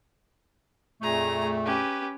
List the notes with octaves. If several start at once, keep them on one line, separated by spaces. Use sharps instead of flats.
F2 A#2 A3 G#4 A#5
C#4 G4 B4